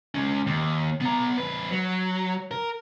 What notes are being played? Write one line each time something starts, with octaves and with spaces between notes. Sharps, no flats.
G#3 C#4
D#2
B3 A#5
F2 B4
F#3
A#4